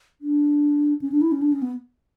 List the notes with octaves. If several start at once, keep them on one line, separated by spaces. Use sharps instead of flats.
D4
C#4
D4
E4
C#4
D4
C#4
B3